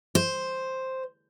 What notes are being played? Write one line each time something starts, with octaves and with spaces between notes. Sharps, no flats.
C5